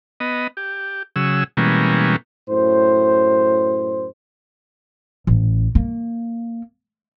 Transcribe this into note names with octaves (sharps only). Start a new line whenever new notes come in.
B3 D#5
G4
C#3 F#3 G#4 E6
B2 E3 G3 G#3 A#3 C#4
F#2 A2 C5
A1
A#3